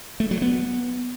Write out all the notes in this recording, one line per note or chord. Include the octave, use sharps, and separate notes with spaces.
A3
F#3
B3